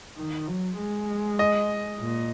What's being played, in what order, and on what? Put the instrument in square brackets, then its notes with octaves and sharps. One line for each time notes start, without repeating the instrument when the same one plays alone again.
[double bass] D#3
F#3
G#3
[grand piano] D#5
[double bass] A#2